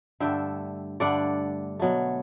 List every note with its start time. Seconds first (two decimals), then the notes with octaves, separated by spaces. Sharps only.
0.20 G2 D3 A3 E5 G5
1.00 G2 D3 A3 D5 F#5
1.80 B2 F#3 A3